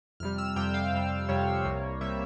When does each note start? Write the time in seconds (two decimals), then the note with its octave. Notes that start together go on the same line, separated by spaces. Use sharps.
0.20 F2 C3 G3 F6
0.38 E6
0.56 F2 C3 G3 G5
0.74 F5
0.93 F2 C3 G3
1.29 F2 C3 G3 C#5
1.65 C2 C3 G3 A#3
2.01 C3 G3 A#3 E5